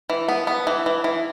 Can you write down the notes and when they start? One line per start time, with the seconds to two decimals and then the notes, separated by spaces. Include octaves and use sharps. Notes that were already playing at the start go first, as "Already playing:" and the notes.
0.10 E3
0.28 B3
0.47 B3
0.67 E3
0.86 E3
1.04 E3